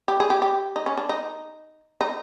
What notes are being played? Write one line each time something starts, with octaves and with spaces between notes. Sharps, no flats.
G4
G#4
G4
G4
D#4
C#4
D4
D#4
D#4